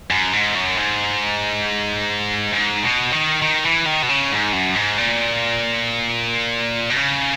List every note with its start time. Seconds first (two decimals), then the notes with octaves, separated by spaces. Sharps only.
0.10 F#2
0.33 G#2
0.55 F#2
0.77 G#2
2.54 G#2
2.84 B2
3.12 D#3
3.42 D#3
3.65 E3
3.86 D#3
4.03 B2
4.09 C#3
4.32 G#2
4.53 F#2
4.75 G#2
4.98 A#2
6.90 B2
6.96 C#3